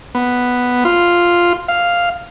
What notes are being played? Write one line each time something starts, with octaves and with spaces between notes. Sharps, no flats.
B3
F4
F5